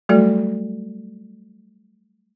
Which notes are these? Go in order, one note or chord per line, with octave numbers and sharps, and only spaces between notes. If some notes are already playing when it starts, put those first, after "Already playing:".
F#3 G3 A3 F#4 A4 D5